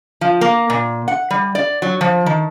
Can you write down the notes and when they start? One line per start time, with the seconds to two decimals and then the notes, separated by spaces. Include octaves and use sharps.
0.21 F3
0.41 A#3
0.70 A#2
1.08 F#5
1.31 G3
1.55 D5
1.82 F#3
2.01 F3
2.26 D#3